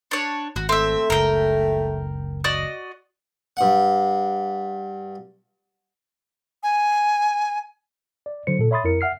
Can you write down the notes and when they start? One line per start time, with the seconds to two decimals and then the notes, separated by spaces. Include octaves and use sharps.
0.11 D4 C#5
0.56 G#1 F#4
0.69 A3 C4 E5
1.10 F#1 C#2 A#4 G5
2.44 F#4 D5 D#5
3.57 G2 F#5
6.63 G#5
8.26 D5
8.47 D3 F#3 C5 C#7
8.59 A#2 A4
8.71 C#5 E5 B5 C6 D#6 A6
8.84 F2 E4 A#4 C#7
9.01 E5 F#5 F6 C7